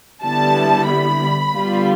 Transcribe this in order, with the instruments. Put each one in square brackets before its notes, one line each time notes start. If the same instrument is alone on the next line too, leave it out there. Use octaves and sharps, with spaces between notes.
[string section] D3 G3 B3 E4 A5
B5
D3 G3 B3 F4